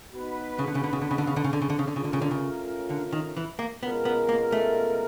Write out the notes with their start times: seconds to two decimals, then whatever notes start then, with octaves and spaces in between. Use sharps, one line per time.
0.12 B3 D#4 F#4 B4
0.59 C#3
0.67 D3
0.75 C#3
0.84 D3
0.93 C#3
1.02 D3
1.11 C#3
1.18 D3
1.27 C#3
1.36 D3
1.44 C#3
1.53 D3
1.62 C#3
1.70 D3
1.79 C#3
1.87 D3
1.96 C#3 A3 C#4 F4 A#4
2.04 D3
2.13 C#3
2.22 D3
2.31 C#3
2.90 D3
3.13 D#3
3.37 E3
3.59 A#3
3.83 B2 G#3 B3 C#4 F4 A#4
4.05 B3
4.29 A#3
4.52 A3